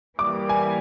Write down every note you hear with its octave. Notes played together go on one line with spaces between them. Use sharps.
E3 G3 A#3 D6
G#5